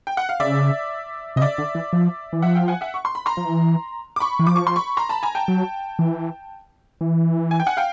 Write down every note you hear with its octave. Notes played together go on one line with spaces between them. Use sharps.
G5
F#5
F5
C#3 D5 E5
C3 D#5
C#3 D5 E5
D3
E3
F3
E3
F3 E5 F#5
F5 G5
F#5 G#5
E5 F#5
C#6
C6
B5
A#5 C6
F3
E3
D6
B5 C#6
E3
F3 D6
C#6
C6
B5 C#6
A#5 C6
A5 B5
G#5 A#5
G5 A5
F#3
E3
E3
G#5
G5
F#5 G#5
F5 G5